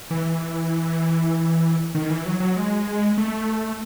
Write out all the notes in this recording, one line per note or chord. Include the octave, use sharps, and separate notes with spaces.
E3
D#3
E3
F#3
F#3
G#3
A3